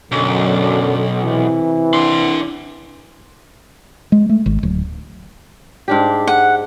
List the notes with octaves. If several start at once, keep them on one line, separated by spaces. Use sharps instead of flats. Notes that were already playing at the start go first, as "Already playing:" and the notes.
B1 F#2 D3
C3 E3
D4 C6
G#3
A3
G#1
D1
G#2 D4 G4
F#5